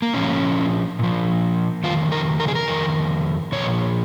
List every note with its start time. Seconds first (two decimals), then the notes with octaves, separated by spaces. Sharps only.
0.02 A#3
0.13 A#2 F3 C#4
0.99 A#2 F3
1.83 F2 D#3 F4
2.12 A#4
2.40 A#4
2.48 G#4
2.55 A#4
2.68 F2 D#3
3.52 A#2 F3 C#5